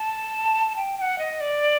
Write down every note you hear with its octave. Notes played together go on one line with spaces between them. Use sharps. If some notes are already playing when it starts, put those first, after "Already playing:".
Already playing: A5
G5
G5
F#5
D#5
D5